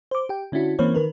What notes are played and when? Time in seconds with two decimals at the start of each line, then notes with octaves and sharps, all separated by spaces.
0.11 C5 D6
0.29 G4 G5
0.52 D3 C#4 D4 E4 F#4
0.79 E3 A#3 C4 C#4 C5 C#5
0.94 D#3 A#4 B4